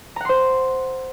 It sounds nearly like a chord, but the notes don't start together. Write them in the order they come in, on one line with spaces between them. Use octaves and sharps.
A#5 F#5 C6 C5